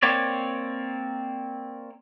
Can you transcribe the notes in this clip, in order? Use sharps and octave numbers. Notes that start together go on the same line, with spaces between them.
A#3 C4 C#5 D5